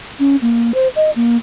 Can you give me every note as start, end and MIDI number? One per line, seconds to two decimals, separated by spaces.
0.20 0.36 61
0.42 0.72 58
0.74 0.88 72
0.96 1.10 75
1.16 1.37 58